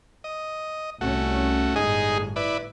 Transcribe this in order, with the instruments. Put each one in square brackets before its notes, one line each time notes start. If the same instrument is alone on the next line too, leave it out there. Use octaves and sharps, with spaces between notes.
[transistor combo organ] D#5
[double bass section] C2 C#4 [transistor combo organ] A3 F#4
[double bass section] G1 A2 [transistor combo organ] G#3 D#4 G#4
[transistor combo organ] E4 B4 D5